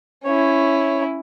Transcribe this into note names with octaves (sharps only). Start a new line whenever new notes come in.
C#4 E4 C#5